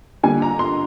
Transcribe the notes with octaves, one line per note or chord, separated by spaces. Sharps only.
D3 G3 A#3 G#5
A#5
C6